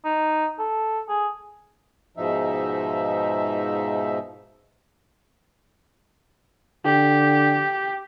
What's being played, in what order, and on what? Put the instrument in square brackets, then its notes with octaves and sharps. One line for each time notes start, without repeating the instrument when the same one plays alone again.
[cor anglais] D#4
A4
G#4
[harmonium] G#2 B2 F3 D#4 E5
[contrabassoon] D3 [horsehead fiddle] G4